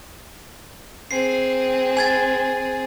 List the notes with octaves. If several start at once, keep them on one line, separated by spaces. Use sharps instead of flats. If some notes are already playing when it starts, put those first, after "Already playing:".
C4 G#4 C7
G#5 G#6 A6